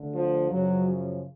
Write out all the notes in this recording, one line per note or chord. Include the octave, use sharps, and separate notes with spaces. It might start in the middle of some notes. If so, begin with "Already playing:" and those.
Already playing: D2 D3
F3
F#2 C#3 F3 F#3